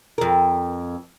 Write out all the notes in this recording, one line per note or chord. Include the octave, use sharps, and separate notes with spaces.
F2 A#4